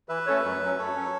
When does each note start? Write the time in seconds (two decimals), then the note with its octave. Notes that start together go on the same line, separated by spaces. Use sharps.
0.09 E3 B4 E5
0.26 A3 C#4 A4 C#5
0.44 F#2
0.62 F#3 C#4
0.78 F#2 A4 C#5
0.95 F#3 C#4